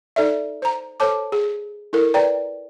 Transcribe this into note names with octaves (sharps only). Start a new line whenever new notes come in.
D#4 A4 D5 E5
C5 A#5
A4 C5 C#5 A5 D6
G#4
E4 A4 A#4
B4 D5 G5 A#5